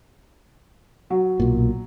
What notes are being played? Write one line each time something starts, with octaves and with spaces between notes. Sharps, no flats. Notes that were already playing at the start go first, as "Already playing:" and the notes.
F#3
B1 A#2